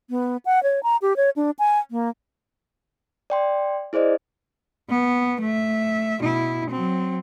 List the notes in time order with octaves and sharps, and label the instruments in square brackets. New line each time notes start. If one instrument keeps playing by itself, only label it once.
[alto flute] B3
F#5
C#5
A#5
G4
C#5
D4
G#5
A#3
[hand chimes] D5 G5 C6
E4 G#4 C5 D5 D#5
[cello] B3
A3 E5
B2 E4
F#3 C4